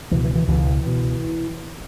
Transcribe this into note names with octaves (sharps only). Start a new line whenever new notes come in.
C#2 B2 E3
E3
E3
C#2 B2 E3
B2